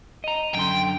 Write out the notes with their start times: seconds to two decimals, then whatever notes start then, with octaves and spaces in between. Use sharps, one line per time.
0.24 D#5 A#5
0.55 F#2 D3 G5 C6